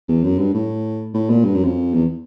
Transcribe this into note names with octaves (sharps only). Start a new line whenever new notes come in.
E2
F#2
G2
A2
A2
A#2
G2
F#2
F2
E2